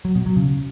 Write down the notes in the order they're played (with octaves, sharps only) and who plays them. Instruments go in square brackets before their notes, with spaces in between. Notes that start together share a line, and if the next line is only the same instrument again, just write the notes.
[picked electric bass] F#3
B2
F#3
C#3